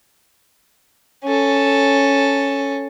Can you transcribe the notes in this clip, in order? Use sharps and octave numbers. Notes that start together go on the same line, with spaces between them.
C#4 A4